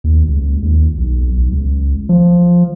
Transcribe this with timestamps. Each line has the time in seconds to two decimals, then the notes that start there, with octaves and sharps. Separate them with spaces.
0.04 D#2
0.28 C#2
0.63 D#2
0.98 B1
1.38 B1
1.52 C#2
2.09 F3